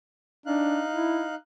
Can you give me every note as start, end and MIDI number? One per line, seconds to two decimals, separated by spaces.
0.46 0.83 62
0.46 1.35 63
0.46 1.35 77
0.46 1.35 90
0.92 1.24 64